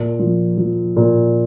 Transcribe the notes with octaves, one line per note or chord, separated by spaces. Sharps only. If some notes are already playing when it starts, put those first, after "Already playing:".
Already playing: A#2
F3
F3
A#2